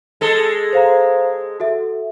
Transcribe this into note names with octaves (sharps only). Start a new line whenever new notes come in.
G#3 A4
C5 F5 A#5
F#4 A4 E5